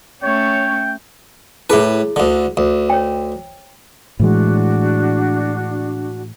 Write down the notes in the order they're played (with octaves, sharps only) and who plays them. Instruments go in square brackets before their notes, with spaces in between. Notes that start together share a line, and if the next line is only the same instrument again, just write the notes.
[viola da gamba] A3 C#4 [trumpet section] C#5 [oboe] G5
[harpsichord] A2 B4 [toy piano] E4 G#4
[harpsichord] D2 D3
D2
[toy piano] C#5 G5
[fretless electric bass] A2 E3 G#3 [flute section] D4 F#4